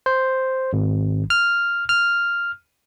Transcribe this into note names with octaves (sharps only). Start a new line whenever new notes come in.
C5
G#1
F6
F6